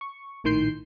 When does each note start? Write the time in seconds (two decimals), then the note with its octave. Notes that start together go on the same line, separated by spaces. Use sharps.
0.01 C#6
0.44 A#1 A2 D#3 C6 G6 C7